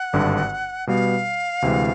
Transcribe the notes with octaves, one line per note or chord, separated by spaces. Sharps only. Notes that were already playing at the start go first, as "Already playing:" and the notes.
Already playing: F#5
G#1 G2 D3
B2 G3 B3 F5
D2 C3 E3 G#3